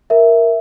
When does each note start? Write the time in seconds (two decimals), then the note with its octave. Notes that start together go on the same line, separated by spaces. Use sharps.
0.10 A#4 E5